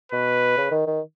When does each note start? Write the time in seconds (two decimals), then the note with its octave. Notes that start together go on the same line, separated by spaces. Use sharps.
0.12 B2 B4
0.57 C#3
0.71 D#3
0.87 D#3